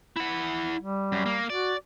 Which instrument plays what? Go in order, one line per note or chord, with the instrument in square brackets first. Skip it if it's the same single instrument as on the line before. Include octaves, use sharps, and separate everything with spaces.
[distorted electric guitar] E4 F#5
[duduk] G3
[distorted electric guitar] F#2
A#3
[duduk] F#4 [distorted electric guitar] D5